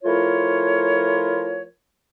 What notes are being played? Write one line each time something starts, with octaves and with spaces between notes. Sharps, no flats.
F3 A3 E4 F4 A#4 C#5